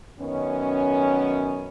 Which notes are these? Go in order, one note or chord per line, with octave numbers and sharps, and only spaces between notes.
F#2 D#3 B3 C#4